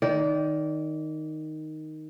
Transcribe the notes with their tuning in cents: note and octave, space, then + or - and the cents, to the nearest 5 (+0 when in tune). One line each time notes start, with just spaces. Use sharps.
D#3 +0 D5 -25